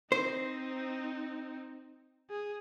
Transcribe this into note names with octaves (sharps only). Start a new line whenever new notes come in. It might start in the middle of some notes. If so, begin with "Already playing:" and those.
C4 D#4 C5
G#4